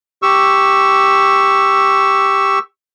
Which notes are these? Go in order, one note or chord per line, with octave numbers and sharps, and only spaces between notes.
G4 C#6 E6